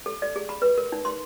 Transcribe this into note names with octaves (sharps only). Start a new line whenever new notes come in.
A4
D5
G#4
B5
B4
A#4
D#4
C6